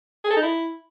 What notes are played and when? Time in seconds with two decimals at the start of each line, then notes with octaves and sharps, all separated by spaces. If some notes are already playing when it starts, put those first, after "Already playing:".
0.24 G#4
0.31 A4
0.37 D#4
0.43 E4